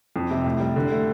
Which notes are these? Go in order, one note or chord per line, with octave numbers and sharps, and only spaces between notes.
F2
C3
A2
G3
D3
A3